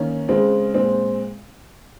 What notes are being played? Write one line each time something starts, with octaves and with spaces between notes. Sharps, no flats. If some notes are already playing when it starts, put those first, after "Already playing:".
Already playing: D#3 A#3 C#4
C#3 G#3 C4
A#2 G#3 C4